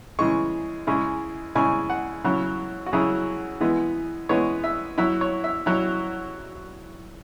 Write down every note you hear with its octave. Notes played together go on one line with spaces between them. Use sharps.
C#3 E3 G#3 C#6
C#3 G#3 C#4 E4
C#3 G#3 C#4 E4 G#5
F#5
C#3 F#3 E4
F#4
C#3 F#3 E4 G#4
E3 G#3 B3
E3 G#3 B3 C#5
E5
F#3 E4 E5
C#5
E5
F#3 E4 F#5